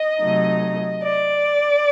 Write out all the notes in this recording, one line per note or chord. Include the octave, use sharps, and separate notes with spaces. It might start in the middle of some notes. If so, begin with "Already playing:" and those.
Already playing: D#5
C3 F#3 A3 D#4
D5